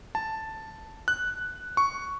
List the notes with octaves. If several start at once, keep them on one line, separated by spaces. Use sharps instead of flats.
A5
F#6
C#6